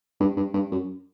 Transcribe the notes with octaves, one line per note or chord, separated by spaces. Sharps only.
G2
G2
G2
F#2